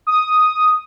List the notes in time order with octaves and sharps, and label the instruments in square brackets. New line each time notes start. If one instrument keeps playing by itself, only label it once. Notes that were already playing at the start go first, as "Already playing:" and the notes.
[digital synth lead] D#6